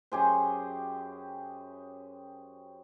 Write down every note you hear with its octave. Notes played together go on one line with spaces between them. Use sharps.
F#2 G4 G#4 C5